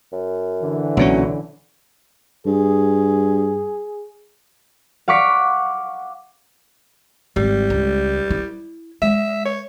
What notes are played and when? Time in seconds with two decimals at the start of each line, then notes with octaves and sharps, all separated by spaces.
0.12 F#2
0.62 D3 E3
0.97 B1 A#2 F#3 C#4
2.46 G2 G#4
5.08 F5 F#5 C#6 D6 B6
7.36 G#1 G3
7.70 C#2
8.31 E4
9.02 G#3 E5
9.45 C#5